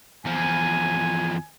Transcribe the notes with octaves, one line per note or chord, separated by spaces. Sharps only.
E2 F3 G#5